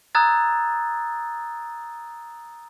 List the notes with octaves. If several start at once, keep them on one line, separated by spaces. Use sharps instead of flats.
A#5 D#6 E6 F#6 G#6 A6